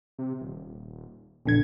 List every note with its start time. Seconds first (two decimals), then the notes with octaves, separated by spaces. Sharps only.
0.19 C3
0.41 D#1
1.46 A#1 E2 D3 G#6